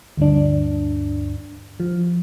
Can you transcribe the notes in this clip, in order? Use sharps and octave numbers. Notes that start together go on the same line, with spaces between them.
D2 G2 D4
F3